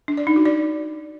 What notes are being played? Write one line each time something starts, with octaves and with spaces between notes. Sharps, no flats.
D4
D5
D#4
F#4
D5